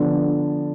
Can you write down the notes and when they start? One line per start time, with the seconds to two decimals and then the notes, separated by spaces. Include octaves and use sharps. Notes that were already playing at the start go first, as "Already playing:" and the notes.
Already playing: D3 F3 B3 D4